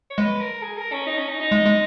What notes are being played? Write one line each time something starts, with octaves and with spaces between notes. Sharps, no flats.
C#5
G#3 B4
A#4
G#4
A#4
C#4
D#4
C#4
D#4
D#4
G#3
G#3